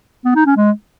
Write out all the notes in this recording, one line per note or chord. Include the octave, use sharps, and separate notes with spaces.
B3
D#4
C#4
G#3